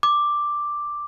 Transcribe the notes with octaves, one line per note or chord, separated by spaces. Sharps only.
D6